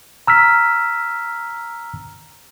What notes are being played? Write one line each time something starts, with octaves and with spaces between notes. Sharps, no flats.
A#5 E6 F6 B6